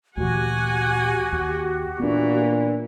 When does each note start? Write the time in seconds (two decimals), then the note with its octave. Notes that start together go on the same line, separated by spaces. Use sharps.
0.17 D2 A#2 E3 F#4 G4 F#5 G#5
1.32 D#2
2.00 A#2 E3 B3 D4